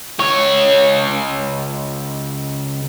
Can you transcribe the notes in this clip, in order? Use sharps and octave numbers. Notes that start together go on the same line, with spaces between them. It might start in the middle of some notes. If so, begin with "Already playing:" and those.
C#2 C#5